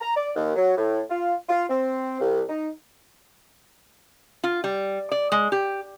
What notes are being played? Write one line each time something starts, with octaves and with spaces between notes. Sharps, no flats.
A#5
D5
D#2
F#3
A2
F4
F4
C4
C2
D#4
F4
G3
D5
G#3
G4